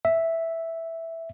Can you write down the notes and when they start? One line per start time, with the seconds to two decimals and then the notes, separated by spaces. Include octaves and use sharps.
0.05 E5